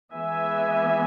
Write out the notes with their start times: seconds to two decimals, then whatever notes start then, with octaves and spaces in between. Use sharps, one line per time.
0.13 E3 G#3 B3 E5 G#5